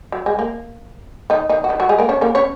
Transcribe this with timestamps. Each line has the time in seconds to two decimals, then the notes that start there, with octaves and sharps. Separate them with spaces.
0.12 F#3
0.26 G#3
0.39 A#3
1.30 D#3 D#4
1.49 D#3 D#4
1.64 F#4
1.69 D#3 D#4
1.80 F#3 F#4
1.89 G#3 G#4
1.98 A#3 A#4
2.09 C#4 C#5
2.21 A#3 A#4
2.35 C#4 C#5